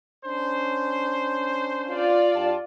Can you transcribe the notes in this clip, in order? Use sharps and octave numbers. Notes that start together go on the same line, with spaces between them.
C#4 D4 C5
F4 D5
G2 G4 A5